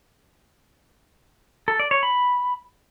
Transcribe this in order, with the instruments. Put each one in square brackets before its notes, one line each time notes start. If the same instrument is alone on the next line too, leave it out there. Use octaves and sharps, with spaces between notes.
[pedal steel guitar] A4
D5
C#5
B5